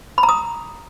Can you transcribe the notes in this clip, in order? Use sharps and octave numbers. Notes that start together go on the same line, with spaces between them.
B5
A#5
D#6